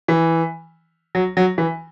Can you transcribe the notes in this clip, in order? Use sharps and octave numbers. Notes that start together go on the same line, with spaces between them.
E3
F#3
F#3
E3